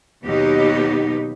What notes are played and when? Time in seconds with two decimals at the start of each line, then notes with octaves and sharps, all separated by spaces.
0.24 D#2 B2 F#3 D#4 G4